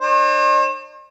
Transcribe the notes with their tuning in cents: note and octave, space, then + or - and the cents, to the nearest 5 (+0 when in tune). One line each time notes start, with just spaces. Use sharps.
D4 +45 C5 +45